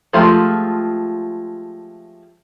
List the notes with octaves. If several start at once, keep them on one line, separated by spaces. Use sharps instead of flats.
F3 G#3 A3 F4 G4